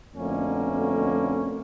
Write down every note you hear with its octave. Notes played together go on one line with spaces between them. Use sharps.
F2 B2 D3 A3 A#3 C#4